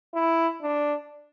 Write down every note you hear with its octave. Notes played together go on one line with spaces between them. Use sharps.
E4
D4